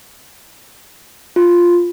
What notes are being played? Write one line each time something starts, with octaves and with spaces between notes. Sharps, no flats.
F4